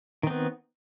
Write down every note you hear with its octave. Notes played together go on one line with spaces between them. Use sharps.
D#3 B3 C4